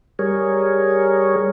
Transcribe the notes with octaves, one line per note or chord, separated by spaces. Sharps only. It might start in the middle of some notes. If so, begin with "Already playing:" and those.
G3 G#4 A#4 C#5